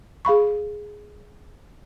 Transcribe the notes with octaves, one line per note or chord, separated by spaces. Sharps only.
G#4 F5 B5 C#6